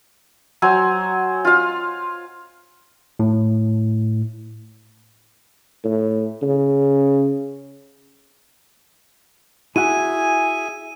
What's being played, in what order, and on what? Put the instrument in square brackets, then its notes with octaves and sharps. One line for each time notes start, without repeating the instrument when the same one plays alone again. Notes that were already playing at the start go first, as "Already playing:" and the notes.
[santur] F#3 C5 G#5
F4 F5
[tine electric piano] A2
[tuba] A2
C#3
[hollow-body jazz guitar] E4 F#4 F#5 [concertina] G#4 E5 [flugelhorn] G#5 [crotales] D#7